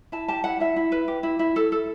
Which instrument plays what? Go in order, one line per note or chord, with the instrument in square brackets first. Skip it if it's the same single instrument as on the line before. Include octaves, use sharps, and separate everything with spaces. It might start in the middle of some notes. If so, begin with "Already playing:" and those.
[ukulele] E4 A5
G4 A5
E4 F#5
E4 E5
E4
B4
G4
E4
E4
A4
A4